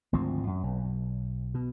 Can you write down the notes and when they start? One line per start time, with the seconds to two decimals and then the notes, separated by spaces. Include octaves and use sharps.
0.13 G#1 D2 F3 C4
0.47 F#2
0.63 B1
1.54 B2